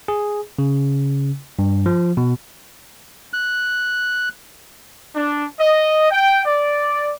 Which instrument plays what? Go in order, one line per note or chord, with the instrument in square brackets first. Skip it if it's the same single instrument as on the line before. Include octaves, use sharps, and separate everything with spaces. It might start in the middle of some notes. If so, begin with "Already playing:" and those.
[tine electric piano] G#4
C#3
G2
F3
B2
[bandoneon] F#6
[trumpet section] D4
D#5
G5
D5